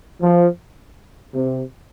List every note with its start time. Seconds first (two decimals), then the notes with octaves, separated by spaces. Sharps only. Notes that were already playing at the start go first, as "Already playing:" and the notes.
0.21 F3
1.34 C3